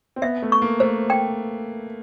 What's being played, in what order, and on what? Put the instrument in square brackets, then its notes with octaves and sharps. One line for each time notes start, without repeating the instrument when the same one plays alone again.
[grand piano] C4
[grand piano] B3 [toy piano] E5
[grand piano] A3
[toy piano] C#6
[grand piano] A#3
[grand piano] A3 [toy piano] C5
[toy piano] G5